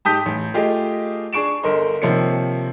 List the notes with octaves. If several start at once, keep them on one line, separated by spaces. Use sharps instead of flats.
G#2 G4 A5 D#6 G6 B6
A1
A3 F4 G4 G#4 D#5
D4 G#4 C#6 D7 E7
G1 D3 A#4 D#5 C6
C3 D#3 F3 A#3 C#5 C#7